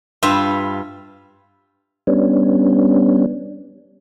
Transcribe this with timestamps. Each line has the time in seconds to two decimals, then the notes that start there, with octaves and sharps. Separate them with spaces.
0.23 G2 F4 B4 E5
2.07 G3 B3 C#4 D4